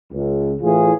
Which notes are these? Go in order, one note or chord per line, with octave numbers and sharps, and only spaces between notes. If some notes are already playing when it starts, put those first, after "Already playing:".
C#2
A2 E3 F4 G#4